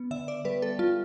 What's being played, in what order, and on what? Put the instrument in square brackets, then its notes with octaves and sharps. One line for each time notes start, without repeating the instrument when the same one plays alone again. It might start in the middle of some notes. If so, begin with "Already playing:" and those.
Already playing: [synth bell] B3
D3 E5
D5
G3 B4
A4
G3 F4